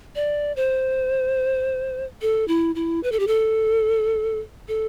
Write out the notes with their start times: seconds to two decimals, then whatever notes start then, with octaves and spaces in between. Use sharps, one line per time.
0.15 D5
0.56 C5
2.22 A4
2.48 E4
2.75 E4
3.03 B4
3.12 A4
3.19 G4
3.27 A4
4.68 A4